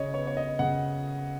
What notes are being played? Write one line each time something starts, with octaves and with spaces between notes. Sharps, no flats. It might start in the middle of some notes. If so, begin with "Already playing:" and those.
Already playing: C#3 C#5 D#5
B3 C#5
C#5
D#5
C#3 F#5